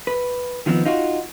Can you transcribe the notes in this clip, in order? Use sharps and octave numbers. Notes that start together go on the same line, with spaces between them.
B4
D#3 F3 B3 C4
D#4 F4 F#4